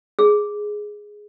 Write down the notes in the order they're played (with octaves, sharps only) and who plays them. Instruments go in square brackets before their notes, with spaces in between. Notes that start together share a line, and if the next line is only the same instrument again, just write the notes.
[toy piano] G#4